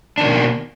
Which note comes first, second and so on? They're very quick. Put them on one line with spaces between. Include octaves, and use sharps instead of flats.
D4 D#3 B2 A#3